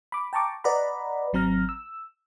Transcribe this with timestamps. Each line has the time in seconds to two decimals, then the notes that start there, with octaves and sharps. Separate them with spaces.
0.12 B5 D6
0.33 G5 A5 A#5 C#6 D6
0.64 B4 D5 D#5 F#5 A#5 B5
1.33 G#1 F#3 C4 A#5 F6 A#6
1.69 E6